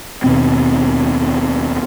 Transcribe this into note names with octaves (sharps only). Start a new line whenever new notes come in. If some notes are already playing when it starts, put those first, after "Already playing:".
D#2 B2 C4